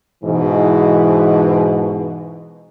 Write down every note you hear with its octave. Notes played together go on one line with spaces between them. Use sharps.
G#2 B2 E3